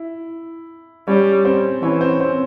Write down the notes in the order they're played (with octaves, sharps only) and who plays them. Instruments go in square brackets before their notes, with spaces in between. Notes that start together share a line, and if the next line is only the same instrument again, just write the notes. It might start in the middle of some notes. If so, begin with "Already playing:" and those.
Already playing: [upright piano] E4
[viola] G3 [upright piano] C#4 C#5
[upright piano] C4 C5
[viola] E3 [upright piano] C#4 C#5
[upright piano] C4 C5
C4 C5